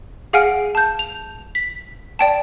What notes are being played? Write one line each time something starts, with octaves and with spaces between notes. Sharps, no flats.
G#4 F5 F#5 G#5 F6 D7
A5 G6
F7
B6
D5 G5 A5